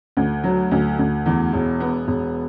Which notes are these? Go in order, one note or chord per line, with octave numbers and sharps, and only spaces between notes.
D2
F#3
D2
D2
E2
E1
B3
E1